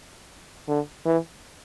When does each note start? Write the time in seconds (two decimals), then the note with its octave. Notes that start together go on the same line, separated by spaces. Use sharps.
0.68 D3
1.06 E3